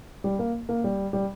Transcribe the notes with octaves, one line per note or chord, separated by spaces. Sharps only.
G3
A#3
A#3
G3
G3